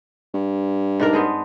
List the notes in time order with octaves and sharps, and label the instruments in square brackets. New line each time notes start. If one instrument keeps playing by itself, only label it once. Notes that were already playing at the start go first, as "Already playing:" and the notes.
[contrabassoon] G2
[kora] G#2 D4 A#4
B3 C4 G#4